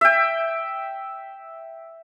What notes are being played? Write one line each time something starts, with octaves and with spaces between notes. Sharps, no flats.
E5 G5